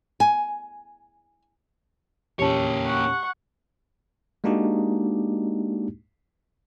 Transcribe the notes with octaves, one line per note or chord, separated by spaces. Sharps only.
G#5
E2 A#2 A#3 C#4 G4 C#5 A5
F#5 C#6
G#3 A#3 D4 D#4 F#4 G4